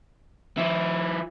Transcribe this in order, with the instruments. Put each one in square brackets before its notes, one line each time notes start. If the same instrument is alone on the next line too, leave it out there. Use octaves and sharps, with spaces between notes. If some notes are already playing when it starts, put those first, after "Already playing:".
[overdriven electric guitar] F3 E4